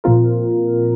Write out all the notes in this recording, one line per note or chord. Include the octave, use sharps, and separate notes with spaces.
A#2 F3 C4 F4 A#4